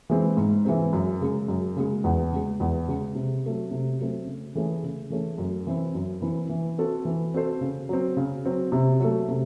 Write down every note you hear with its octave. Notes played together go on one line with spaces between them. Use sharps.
E3 G#3 C4
G#2
E3 G#3 C4
F#2
C#3 G#3
F#2
C#3 G#3
E2
C#3 G#3
E2
C#3 G#3
C3
F#3 A3 C4
C3
F#3 A3 C4
C#3
E3 A3 C#4 G#4
C#3
E3 A3 C#4 G#4
F#2
E3 C4 E4
F#2
E3 C4 E4
E3
C4 F#4 A4 C5
E3
C4 F#4 A4 C5
C#3
F#3 C4
C#3
F#3 C4
C3
F#3 A3
C3